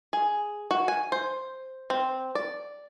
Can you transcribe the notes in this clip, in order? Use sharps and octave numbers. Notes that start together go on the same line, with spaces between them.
G#4
F#4
G#5
C5
C4
D5